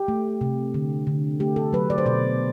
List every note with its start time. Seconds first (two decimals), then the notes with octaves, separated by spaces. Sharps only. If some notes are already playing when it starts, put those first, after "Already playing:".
Already playing: G4
0.08 A3
0.41 C3
0.74 D3
1.07 D3
1.40 A3 G4
1.56 A4
1.73 F#3 B4
1.90 D5
1.98 C5
2.06 B2 D5